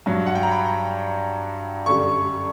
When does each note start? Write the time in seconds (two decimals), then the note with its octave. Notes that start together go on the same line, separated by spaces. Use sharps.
0.06 G2 F#3
0.26 F#5
0.35 G5
0.43 A#5
0.51 B5
1.86 F#2 D3 G3 C#6